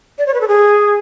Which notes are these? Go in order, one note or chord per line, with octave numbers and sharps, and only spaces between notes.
D5
C#5
B4
A4
G#4